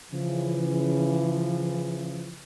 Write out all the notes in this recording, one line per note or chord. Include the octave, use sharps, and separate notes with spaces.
C#3 E3 F3